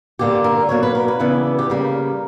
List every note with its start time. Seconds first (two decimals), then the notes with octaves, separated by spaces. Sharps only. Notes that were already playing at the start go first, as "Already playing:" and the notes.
0.19 G2 D3 A#3 D4 G4
0.44 A#4
0.69 B2 F#3 A#3 D4 C#5
0.83 B4
0.95 A#4
1.08 B4
1.20 C#3 E3 B3 D4
1.59 G4
1.70 C#3 G3 A#3 A#4